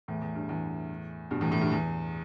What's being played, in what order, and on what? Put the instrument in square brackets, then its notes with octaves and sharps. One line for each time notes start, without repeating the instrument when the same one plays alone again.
[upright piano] E2 A2
E2
G2
E2 A2
G2 B2
E2 A2
E2 A2
G2
E2